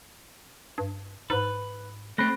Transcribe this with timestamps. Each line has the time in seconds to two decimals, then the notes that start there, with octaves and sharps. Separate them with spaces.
0.78 G2
1.30 G#2 B4
2.18 A3 C4 B5 F#6 A#6